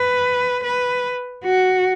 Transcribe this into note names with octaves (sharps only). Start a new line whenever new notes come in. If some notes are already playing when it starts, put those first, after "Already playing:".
Already playing: B4
B4
F#4